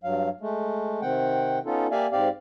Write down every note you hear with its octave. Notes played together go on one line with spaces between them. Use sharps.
G2 F#3 F5
G#3 A3
C3 D#3 C4 F#5 G5
B3 C#4 D#4 F4 A4
A#3 G4 D5 E5 F5 G#5
G#2 C4 G4 D5 F5